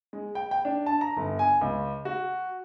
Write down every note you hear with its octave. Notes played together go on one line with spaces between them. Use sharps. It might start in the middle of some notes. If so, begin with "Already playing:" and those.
G#3
G5
G5
D4
A5
A#5
G1
G#5
C#2
F#4